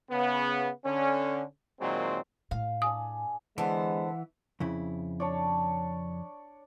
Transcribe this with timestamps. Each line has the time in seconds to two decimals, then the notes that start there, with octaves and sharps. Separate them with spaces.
0.10 C#3 B3
0.84 D3 C#4
1.80 A#2 D#3 F#3 G#3 C4
2.51 A2 F5
2.82 D4 G#4 G#5 D#6
3.58 D3 E3 G#3 B3 C5 F#5
4.60 F2 C#3 E4
5.20 D4 C#5 D5